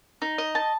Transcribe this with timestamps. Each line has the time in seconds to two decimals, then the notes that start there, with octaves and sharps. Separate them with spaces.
0.22 D#4
0.38 D#5
0.55 A5